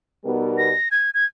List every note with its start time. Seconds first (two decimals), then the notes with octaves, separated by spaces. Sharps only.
0.24 B2 G3 B3 D#4 A#4
0.58 A#6
0.91 G#6
1.14 G#6